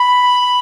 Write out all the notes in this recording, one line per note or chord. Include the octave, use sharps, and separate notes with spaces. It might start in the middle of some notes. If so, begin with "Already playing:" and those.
Already playing: B5